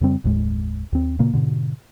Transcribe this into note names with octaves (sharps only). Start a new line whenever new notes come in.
F2 C#3 G3 C4
F#1 D#2 A2 G#3
D#2 C4
A#2 C#3 A#3
G#2 B2 D3